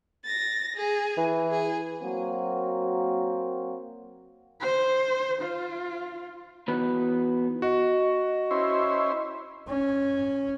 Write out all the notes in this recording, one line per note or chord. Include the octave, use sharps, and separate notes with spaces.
A6 A#6
G#4
E3
G#4
F#3 A#3 C4 F#4
C5
F4
E3 B3 D#4 F#4 B4
F#4 D#5
C#4 E4 C5
C#4